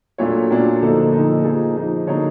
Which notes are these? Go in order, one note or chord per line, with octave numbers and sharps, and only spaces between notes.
A#2 F#3 A3 D4 F4 C#5
A#2 F#3 A3 D4 F4
D3 F3 A#3 D#4 A4
D3 F3 A#3 D#4
F3 A#3 D#4 G#4
F3 A#3 D#4
D3 F#3 A#3 D#4 C#5